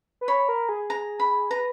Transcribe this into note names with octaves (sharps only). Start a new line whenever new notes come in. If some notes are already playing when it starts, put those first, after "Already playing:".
B4
C#5 B5
A#4
G#4
A#5
B5
B4 A#5